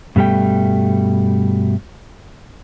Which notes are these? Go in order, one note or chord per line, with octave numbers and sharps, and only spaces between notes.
G2 B2 G3 A3 G5